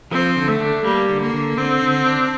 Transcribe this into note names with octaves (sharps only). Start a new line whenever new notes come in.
F3 C4
D3
A3
D4
G3 A#3
D3
A#3
D3
D3 C4
D3
D4